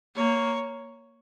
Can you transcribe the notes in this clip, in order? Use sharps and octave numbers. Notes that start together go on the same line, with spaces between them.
A#3 C#5